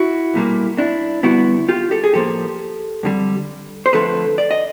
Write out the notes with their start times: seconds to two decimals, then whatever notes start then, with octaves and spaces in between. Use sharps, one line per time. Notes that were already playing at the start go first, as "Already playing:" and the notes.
Already playing: E4 F#4
0.34 B1 A#2 G3 A#3
0.78 D4 E4
1.23 F2 D3 G3 B3 E4 F#4
1.69 F4 G4
1.91 G4 A4
2.04 G#4
2.13 A2 F3 A#3 G4 A4
3.03 F2 D3 G3
3.86 C5
3.93 F2 D3 F3 A3 A4 B4
4.38 D5
4.51 D#5